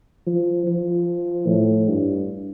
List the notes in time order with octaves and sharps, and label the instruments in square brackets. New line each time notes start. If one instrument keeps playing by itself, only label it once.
[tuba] F3
F3
A2
G2